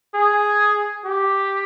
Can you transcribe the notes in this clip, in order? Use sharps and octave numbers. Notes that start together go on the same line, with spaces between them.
G#4
G4